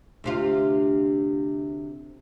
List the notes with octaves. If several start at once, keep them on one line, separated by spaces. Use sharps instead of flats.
D2 C3 F4